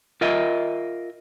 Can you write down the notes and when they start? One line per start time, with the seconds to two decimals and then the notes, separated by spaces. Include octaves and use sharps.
0.21 F4 A#4 D#5 E5